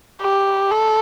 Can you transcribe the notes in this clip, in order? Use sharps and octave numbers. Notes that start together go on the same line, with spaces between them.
G4
A4